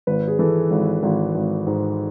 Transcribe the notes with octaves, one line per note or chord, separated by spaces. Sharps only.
G#1 B4
G#4
E3 A4
G#1
G#1
G#1
G#2